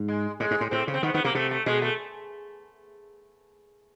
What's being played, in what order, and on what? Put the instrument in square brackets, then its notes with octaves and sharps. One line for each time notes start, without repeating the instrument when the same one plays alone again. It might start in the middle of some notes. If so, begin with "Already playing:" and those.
Already playing: [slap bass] G#2
[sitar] G#3
[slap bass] A2 [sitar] G#3
[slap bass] G#2
A2
[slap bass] A2 [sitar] C4
[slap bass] C#3
[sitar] C4
[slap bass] D#3 [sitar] B3
[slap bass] D#3 [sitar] B3
[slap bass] C3 [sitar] A#3
[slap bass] C3 [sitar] A3
[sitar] A3
[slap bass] B2 [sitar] G#3
[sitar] A3